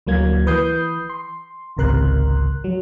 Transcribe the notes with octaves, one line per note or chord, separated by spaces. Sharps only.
D2 F#3 A#3 G#6
E3 B4 D#6 G6 C7
C6
G#1 C#2 C3 A#4 C6 F#6
F#3